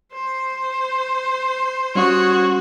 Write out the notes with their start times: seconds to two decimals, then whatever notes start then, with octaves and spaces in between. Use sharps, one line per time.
0.13 C5
1.95 G3 C#4 F#4 C#5 D#6